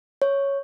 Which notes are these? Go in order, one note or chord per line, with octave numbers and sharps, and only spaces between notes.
C#5